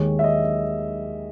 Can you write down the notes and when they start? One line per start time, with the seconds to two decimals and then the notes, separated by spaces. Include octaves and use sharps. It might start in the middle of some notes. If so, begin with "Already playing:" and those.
Already playing: D#2 D#3 G#3 C#5
0.19 E5
0.24 D#5